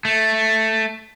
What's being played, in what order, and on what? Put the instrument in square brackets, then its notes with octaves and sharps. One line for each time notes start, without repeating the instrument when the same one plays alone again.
[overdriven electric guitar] A3